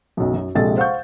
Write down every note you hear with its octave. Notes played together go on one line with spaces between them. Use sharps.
B1 F#2
F#2
A#1 C3 G#3 A4 D#5 A6
C5 F5 F#5 C#6 G6